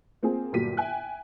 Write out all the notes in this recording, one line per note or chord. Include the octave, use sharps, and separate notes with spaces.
A#3 C4 F4 G#4
G1 A#2 F#3 G4 B6 D#7
E5 G5 G#5 F#6